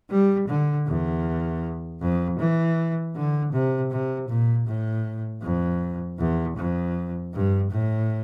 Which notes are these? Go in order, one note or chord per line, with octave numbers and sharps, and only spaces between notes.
G3
D3
E2
F2
E3
D3
C3
C3
A#2
A2
F2
E2
F2
G2
A2